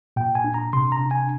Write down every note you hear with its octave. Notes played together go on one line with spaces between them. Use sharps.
A#2 G5
G#5
D4
A#5
C3 C6
A#5
D4
G#5